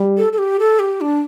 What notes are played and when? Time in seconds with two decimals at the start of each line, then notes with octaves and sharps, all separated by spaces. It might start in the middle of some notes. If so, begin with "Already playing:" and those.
Already playing: G3
0.18 A4
0.33 A4
0.38 G4
0.60 A4
0.79 G4
1.01 D4